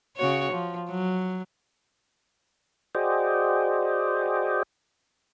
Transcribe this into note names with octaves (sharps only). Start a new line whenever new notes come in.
C#3 F#4 C#5
F3
F#3
F#4 G#4 C5 D5 D#5 G5